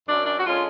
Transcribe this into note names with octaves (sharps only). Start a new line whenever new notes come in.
F#2 D4
D4
F#4
D3 G#3 C#4 F4